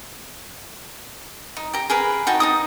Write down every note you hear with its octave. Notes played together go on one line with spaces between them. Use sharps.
D#4
G4 A#5
G#4 A#4 B4
D#4 F#4 G5 A5
D#4 F#4 D#6